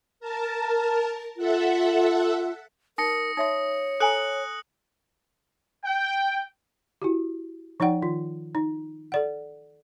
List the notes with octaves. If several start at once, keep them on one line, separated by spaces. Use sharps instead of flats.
A#4 A5
F4 A4 E5 F#5
D#4 A#4 D#6 A#6 C#7
D#4 C#5 E5 C6 D#6
A4 G#5 A#5 F#6 C#7 F#7
G5
E4 F#4 G4
F3 D#4 D5 F#5 G5
D#3 F4
D#4
A4 D5 F#5